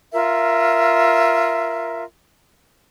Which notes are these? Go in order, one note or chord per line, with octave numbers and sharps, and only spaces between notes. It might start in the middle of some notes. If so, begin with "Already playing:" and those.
F4 A#4 E5